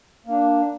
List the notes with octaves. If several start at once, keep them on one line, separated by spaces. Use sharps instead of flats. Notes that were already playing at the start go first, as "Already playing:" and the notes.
A#3 D4